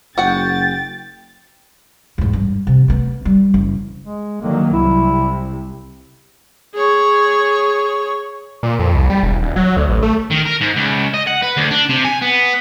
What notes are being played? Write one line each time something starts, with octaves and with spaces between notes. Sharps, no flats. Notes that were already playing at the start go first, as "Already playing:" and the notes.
F#1 F#4 F#5 G5 A6
E2 G#2
G2
C3
A3 B3
G3
F#1
G#3
D3 D#3 F#3 A#3
C2 C3 E4
G#4 C#5
A#2
F2
C2
G3
E1
D#1
F#3
D2
A1
A3
D#3
A#4
G#2
C#2
D#5
F#5
B4
D2
D4
C3
G#5
B3